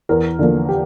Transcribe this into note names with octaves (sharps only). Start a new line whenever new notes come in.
E2 A#4
D3 F3 A#3
G4